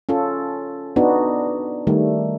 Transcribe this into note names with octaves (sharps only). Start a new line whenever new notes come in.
C#4 F4 A4
B3 D4 D#4 F#4
D#3 G3 A3